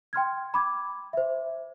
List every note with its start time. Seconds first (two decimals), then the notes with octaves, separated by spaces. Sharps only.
0.13 G5 C6 F6 G#6
0.54 B5 D6 G#6
1.13 C5 E5